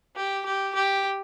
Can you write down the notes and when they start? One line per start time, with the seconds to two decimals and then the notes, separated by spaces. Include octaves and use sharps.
0.16 G4
0.45 G4
0.75 G4